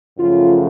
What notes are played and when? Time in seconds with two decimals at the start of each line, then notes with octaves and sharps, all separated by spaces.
0.18 F#2 C#3 F3 A3 F4